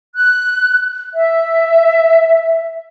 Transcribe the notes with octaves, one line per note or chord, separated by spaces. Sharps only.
F#6
E5